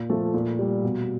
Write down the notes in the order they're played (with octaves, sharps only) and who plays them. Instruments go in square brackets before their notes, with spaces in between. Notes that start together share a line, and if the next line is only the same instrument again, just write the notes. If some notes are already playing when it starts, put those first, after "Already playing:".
Already playing: [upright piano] A#2
F3 A3
A#2
G3
B2